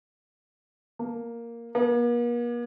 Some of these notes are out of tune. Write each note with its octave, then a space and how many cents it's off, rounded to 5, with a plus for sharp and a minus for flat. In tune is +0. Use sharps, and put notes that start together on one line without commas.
A#3 +0
A#3 +45